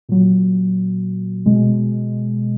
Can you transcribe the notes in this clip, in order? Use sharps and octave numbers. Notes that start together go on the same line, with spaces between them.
A#2 F#3
B2 G#3